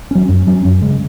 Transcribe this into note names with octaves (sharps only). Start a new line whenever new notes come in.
F#3 C#4
F#2
F#3 C#4
F#2
C#3 G#3